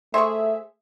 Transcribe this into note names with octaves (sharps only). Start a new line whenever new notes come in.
A3 G#4 C5 E5 C#6